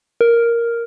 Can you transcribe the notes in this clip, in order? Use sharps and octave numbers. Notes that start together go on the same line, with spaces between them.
A#4